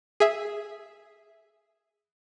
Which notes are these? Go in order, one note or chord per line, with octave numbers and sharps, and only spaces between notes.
G#4 E5